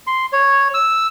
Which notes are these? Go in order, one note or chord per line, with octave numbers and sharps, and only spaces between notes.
C6
C#5
E6